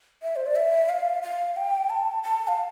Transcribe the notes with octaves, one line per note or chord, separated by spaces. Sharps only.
E5
C5
D5
E5
F5
F5
G5
A5
A5
F5